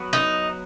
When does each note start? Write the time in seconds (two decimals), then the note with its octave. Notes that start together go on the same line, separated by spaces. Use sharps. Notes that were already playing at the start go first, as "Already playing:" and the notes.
Already playing: F#3 B3 F#4 B4
0.13 D#4